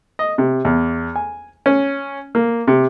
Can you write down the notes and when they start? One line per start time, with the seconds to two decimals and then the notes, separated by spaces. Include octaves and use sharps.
0.19 D#5
0.38 C3
0.65 E2
1.16 G#5
1.66 C#4
2.35 A#3
2.67 C3